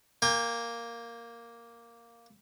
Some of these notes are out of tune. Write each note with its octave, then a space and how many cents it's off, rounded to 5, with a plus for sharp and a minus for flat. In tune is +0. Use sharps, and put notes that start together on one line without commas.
A#3 +0 G5 +35